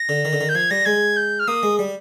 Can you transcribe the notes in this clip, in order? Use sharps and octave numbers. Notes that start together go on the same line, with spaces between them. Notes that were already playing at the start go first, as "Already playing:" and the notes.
Already playing: A#6
D3
D#3
D3
D#3
G6
F3 G#6
G3 A#6
G#3 G#6
G6
F6
A#3 D#6
G#3
G3